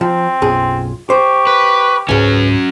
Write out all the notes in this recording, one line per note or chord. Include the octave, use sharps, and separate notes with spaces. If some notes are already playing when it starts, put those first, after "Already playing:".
F3 C4
B1 F#2 F4 G#4
G4 C5 C#6
B4
C#2 G#2 F#3 C#4 B4